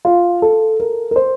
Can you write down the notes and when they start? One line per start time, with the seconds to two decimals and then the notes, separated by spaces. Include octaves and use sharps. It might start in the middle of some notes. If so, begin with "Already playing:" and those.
0.05 F4
0.42 A4
0.80 A#4
1.11 A#4
1.16 C5